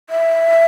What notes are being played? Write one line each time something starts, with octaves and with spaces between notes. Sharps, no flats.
E5